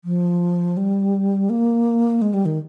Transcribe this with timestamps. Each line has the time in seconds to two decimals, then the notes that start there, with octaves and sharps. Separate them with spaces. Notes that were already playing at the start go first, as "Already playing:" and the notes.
0.05 F3
0.77 G3
1.50 A#3
2.22 G#3
2.34 G3
2.46 D#3